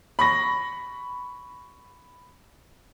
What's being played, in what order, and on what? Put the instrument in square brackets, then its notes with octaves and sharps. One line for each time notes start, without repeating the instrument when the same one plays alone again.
[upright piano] B5 C#6 A#6